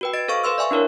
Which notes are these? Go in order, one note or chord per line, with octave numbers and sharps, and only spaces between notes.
F#4 B4 G5
D#5 A6 D7
A4 C5 F5 C#6
B4 F5 C6 E6
D5 E5 G#5 C#6
D4 E4 A#4 C#5